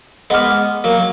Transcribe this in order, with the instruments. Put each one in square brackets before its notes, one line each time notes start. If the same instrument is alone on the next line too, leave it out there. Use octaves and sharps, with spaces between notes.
[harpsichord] G#3 B3 [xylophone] D#5 F#5 D6 F6
[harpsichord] F#3 A#3